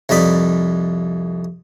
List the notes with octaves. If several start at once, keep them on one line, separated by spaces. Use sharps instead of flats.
C2 F2 D#4 D5 B5